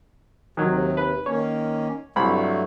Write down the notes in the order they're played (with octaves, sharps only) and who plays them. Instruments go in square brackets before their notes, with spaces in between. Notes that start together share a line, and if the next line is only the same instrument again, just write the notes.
[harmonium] D#2 C3 [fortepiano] D#3 F#3
[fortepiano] B4
[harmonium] D#3 A#3 C#4 [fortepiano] C#5
[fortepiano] C2 B5 [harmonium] G2 F#3 A3